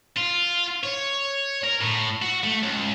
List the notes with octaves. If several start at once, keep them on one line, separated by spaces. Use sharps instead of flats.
F4
C#5
A#4
A2
F#4
A3
C#2